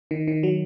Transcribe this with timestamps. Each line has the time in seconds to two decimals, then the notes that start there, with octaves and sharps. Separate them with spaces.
0.11 D#3
0.28 D#3
0.43 F#3